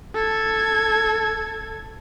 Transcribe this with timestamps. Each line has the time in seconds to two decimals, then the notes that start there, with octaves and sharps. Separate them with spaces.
0.15 A4 G#6